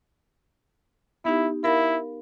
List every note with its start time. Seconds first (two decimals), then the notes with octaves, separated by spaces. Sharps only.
1.25 B3 D#4 E4 G4
1.64 E4 A#4 F5 B5